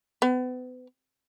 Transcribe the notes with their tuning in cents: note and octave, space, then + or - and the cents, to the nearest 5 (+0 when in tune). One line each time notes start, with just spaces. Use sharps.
B3 +35